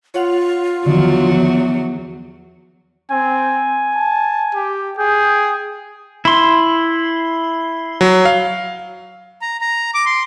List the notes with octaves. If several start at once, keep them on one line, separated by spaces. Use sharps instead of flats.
F4 C#5 F#5 F7
E2 D3 D#3 F3 F#3
C4 G#5
A5
G4
G#4 G5
E4 C6
F#3
F5
A#5
A#5
D6
C6